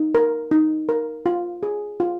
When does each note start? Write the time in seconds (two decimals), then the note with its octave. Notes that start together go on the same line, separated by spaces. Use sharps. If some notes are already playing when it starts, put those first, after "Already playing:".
Already playing: D#4
0.15 A#4
0.51 D#4
0.89 A#4
1.26 F4
1.63 G#4
2.00 F4